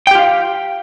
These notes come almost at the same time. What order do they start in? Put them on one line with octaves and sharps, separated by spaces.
G5 G4 F4 F5